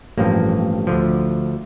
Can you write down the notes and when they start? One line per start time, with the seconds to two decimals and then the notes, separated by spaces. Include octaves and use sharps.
0.17 A1 G2 F3 A#3
0.87 D2 D3 F3